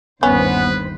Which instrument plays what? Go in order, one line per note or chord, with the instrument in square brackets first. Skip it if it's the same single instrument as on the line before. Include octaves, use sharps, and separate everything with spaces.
[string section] G1 D#2 C5 [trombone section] B3 [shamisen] C#4 [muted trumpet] B4